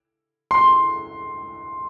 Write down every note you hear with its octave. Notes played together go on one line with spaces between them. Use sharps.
C6